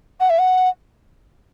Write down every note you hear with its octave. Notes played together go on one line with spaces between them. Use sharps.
F#5
E5
F#5